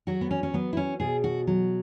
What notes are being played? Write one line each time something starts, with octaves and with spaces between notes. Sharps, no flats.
F#3 F#4
B3
C#4
C#4
F#3 B3
E4
C#4
B2 G#4
F#4
F#3